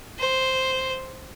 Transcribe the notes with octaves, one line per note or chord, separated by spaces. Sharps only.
C5